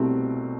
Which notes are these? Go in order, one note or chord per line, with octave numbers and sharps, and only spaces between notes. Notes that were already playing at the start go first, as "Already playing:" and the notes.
Already playing: C2 B2 A3 C4 G4